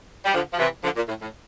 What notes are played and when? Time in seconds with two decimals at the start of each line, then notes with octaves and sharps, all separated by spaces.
0.25 G3
0.34 D3 F3
0.54 F3
0.58 C3 E3
0.84 D3 F3
0.96 A#2
1.08 A2
1.22 A2